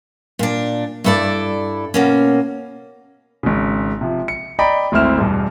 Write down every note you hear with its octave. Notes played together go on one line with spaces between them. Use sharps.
A#2 D4
G2 E4 A4 A#4 D5
B2 A#3 C#4
G#1 C#3
C3 F3
C#7
D5 D#5 G5 A#5 B5
G#1 D2 C4 E4 F6 E7
E2 G2 B2